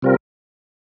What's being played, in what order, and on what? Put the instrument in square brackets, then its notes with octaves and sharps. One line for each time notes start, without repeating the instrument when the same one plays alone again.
[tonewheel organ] C3 G3 C4 F4 A#4